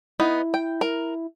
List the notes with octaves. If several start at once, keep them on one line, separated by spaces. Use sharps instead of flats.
B3 D#4 E4
G5
A#4